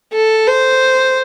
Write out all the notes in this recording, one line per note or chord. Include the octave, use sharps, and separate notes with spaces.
A4
C5